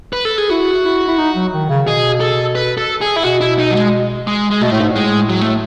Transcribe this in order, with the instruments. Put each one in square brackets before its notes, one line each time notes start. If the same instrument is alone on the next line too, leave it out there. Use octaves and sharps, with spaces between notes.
[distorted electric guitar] B4
A4
G#4
[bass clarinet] E4 [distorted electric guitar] F#4
[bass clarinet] E4
E4
D#4
F#3
D#3
C#3
[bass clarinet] B2 [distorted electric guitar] G#4
[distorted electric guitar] A4
B4
A4
G#4
E4
[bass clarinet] B2 [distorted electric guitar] F#4
[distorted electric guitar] E4
D#4
F#3
G#3
G#3
G#3
[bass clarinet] B2 [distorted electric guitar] A3
[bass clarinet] A2
G#2
[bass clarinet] A2 [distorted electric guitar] G#3
[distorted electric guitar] F#3
A3